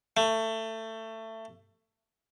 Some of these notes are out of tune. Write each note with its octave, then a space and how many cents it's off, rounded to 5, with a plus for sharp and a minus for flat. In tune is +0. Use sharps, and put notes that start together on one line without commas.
A3 +20